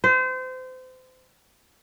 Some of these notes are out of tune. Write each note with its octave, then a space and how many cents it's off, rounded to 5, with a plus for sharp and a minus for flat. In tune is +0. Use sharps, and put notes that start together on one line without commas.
C5 -30